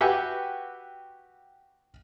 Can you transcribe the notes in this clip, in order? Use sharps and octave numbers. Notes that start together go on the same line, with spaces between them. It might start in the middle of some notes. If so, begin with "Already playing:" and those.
F#4 G4 B4 E5 F#5 G#5